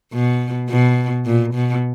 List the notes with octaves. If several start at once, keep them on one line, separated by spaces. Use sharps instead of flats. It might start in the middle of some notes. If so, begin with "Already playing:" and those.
B2
B2
A#2
B2